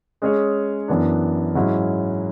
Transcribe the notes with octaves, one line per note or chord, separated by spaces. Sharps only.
G#3 C#4 G#4 C#5
F#2 E3 B3 D4
G#2 F#3 C#4 E4